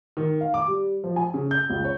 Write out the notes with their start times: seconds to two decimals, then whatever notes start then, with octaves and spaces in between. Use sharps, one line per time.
0.17 D#3
0.41 F5
0.54 D6
0.68 G3
1.04 F3
1.16 G#5
1.34 C#3
1.51 G6
1.70 C#2
1.84 C#5